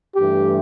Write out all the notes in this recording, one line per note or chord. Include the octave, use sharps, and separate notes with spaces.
G2 E3 A3 G4